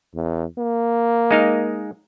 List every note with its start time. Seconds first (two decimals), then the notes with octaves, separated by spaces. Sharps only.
0.15 E2
0.59 A#3
1.31 G#3 D#4 F5